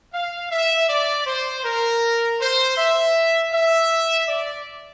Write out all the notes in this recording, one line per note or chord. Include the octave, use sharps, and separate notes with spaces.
F5
E5
D5
C5
A#4
C5
E5
E5
D5